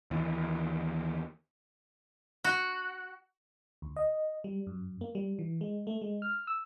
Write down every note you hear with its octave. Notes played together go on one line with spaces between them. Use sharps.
D#2 E3
F#4
D2
D#5
G3
F#2
A#3
G3
E3
G#3
A3
G#3
F6
E6